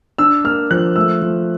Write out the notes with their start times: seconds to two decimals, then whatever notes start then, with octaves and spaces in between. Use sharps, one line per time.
0.18 D4 E6
0.44 A#3 F6
0.71 F3 F#6
0.96 A3 E6
1.22 F3